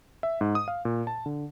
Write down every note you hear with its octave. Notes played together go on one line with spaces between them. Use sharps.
E5
G#2
D#6
F5
A#2
A5
D3